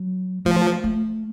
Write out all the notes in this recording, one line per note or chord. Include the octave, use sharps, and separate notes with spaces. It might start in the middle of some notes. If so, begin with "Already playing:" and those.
Already playing: F#3
F3 A3
A3